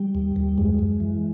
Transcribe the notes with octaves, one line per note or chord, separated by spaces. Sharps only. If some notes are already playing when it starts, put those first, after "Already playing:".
Already playing: G3
D#2
D#2
F#2 G#3
F#2
E3